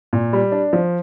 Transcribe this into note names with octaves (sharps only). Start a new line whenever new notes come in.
A#2
G3
D4
F3